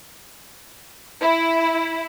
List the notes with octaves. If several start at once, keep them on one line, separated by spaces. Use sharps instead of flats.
E4